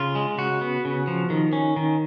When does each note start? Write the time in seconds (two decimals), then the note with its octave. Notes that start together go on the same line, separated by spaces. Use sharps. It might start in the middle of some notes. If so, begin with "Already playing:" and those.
Already playing: C#3 F4
0.15 G#3
0.38 C#3 F#4
0.61 B3
0.85 C#3
1.07 F3
1.30 D#3
1.53 C#4
1.76 D#3